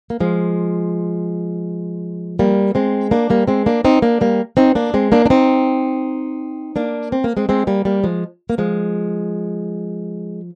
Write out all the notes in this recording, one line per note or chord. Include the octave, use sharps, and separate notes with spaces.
A#3
F3 G#3
G3 A#3
G#3 C4
A#3 D4
G3 A#3
G#3 C4
A#3 D4
C4 D#4
A#3 D4
G3 A#3
C4 D#4
A#3 D4
G#3 C4
A#3 D4
D4
C4 D#4
A#3 D4
C4
A#3
G#3 C4
G#3 C4
G3 A#3
G3 A#3
F3 G#3
A#3
F3 G#3